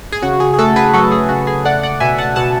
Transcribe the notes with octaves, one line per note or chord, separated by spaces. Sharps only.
G#4
C#3 F#4
G#4
G#4
A3 F#4 A4
G#4 B4
F#3 F#4 A4
G#4
C#3 F#4
G#4
A3 D5 F#5
D5 F#5
B2 E5 G#5
F#5 A5
B2 F#5 A5